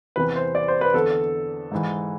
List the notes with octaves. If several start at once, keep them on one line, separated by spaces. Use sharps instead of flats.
E2 C3 E3 B4
C5
D5
C5
B4
E2 D3 A4
G#2 E3